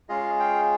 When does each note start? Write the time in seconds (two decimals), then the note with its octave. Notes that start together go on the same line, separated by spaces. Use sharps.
0.09 G#3 C#4 F4 G#4 D#5 F5
0.39 F5 G5